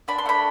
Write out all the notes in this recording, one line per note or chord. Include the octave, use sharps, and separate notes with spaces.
D4 B5
C6
A3 B5